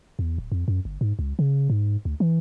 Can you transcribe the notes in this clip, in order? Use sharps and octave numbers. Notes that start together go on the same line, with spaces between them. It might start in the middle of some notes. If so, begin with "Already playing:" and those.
E2
D1
F2
F#2
G1
G#2
C#2
C#3
G#2
D2
E3